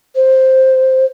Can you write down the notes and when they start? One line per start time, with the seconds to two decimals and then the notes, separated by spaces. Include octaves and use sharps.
0.15 C5